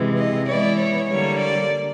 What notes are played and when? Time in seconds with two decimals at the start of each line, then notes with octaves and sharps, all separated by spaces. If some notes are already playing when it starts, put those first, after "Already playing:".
Already playing: C3 E3 G#3
0.18 D#5
0.48 E3 G#3 B3 E4 D5
0.78 C#5
1.08 D3 G3 A#3 C#5
1.39 D5